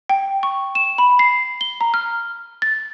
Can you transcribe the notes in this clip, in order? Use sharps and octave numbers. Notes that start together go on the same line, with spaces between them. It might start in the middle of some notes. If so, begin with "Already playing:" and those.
G5
C#6
E7
B5
C7
G7
A#5
F6
A6